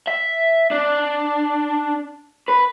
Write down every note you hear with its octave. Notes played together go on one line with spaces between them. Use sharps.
E5
D4
B4